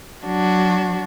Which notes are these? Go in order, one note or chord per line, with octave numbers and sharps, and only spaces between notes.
F#3 D4 F#4